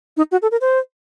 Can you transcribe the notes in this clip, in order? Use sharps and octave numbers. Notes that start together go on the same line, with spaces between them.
D#4
F#4
A4
A#4
C5